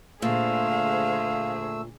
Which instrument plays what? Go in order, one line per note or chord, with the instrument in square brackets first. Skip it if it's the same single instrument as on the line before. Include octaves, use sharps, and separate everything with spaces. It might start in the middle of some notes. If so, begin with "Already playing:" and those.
[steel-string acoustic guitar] A#2 [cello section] D3 G#4 C5 [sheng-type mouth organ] A3 E6 [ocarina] F5